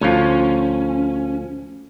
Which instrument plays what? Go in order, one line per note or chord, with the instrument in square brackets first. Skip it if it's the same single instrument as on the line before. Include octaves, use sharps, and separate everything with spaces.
[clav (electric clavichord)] D2 F3 [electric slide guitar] C#4